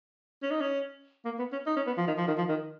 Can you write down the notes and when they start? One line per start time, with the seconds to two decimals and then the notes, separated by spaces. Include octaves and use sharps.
0.43 C#4
0.51 D#4
0.61 C#4
1.25 A#3
1.39 B3
1.52 C#4
1.66 D#4
1.77 C#4
1.87 B3
1.98 F3
2.07 D#3
2.18 F3
2.28 D#3
2.38 F3
2.49 D#3